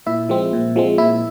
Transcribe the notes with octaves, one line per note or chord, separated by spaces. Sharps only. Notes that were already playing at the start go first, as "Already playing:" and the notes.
A#2 E4 E5
F3 G#3 C4
A#2
F3 G#3 C4
A#2 E4 E5